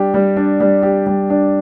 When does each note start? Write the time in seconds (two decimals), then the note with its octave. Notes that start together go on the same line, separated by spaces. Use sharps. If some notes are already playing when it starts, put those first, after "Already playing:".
Already playing: G3 D4 G4
0.14 G3
0.37 D4
0.60 G3
0.83 G4
1.06 G3
1.30 D4